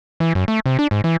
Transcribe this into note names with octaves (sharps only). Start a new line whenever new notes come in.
E3
F#2
A3
C3
D4
G#2
E3